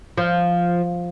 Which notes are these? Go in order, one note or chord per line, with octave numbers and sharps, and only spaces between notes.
F3